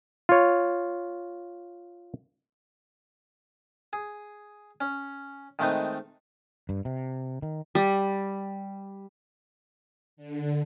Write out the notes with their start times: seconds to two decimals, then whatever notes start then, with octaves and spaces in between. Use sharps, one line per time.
0.29 F4 C#5
3.93 G#4
4.81 C#4
5.59 D#3 G#3 A3 C4 D#4 B4
6.69 G2
6.85 C3
7.42 D#3
7.75 G3
10.17 D3